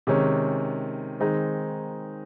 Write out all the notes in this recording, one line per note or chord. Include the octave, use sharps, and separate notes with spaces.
C3 D#3 G#3 C#4
D#3 G#3 C4 D#4